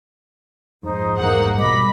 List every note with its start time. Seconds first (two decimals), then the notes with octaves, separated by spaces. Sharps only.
0.83 A#1 F2 G#2 D#4 C5
1.18 E2 G2 A#3 F#5
1.58 B2 G3 D#5 B5 D6